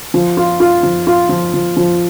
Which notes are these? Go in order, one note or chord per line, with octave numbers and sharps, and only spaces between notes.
F3
F4
F4
F3
F4
F3
F3
F3